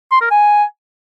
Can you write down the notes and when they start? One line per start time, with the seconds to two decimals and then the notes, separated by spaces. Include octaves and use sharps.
0.11 C6
0.21 A#4
0.31 G#5